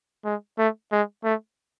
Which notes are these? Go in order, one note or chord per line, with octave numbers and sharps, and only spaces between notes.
G#3
A3
G#3
A3